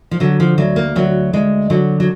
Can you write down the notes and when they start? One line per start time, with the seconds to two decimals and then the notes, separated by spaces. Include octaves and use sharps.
0.11 F3
0.20 D3 F#3
0.40 F3
0.58 D2 F#3
0.76 A#3
0.95 D2 F#3
1.33 D2 G#3
1.70 D3 F#3
2.00 F#3